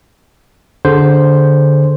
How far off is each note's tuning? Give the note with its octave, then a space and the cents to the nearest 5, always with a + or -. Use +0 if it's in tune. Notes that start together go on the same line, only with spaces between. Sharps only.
D3 +0 G#4 +0 C5 +0